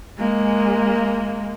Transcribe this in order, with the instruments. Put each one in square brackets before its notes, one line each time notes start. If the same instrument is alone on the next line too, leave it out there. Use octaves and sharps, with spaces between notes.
[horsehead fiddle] G#3 A#3